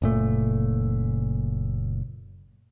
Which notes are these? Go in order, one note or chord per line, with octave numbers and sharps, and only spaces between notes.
F#1 A#2 A3